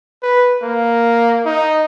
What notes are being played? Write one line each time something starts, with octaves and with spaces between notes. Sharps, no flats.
B4
A#3
D#4